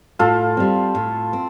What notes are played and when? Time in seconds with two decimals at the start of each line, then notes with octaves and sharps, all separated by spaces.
0.19 A2 F4 A4
0.57 G3 C4
0.95 A2
1.33 C4